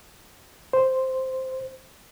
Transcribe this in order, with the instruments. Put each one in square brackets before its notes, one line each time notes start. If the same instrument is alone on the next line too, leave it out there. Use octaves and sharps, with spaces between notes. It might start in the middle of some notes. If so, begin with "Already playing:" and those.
[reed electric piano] C5